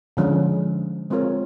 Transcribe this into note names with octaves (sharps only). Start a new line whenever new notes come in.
D3 F3 G#3 C#4
G#3 C4 F4 A#4 C#5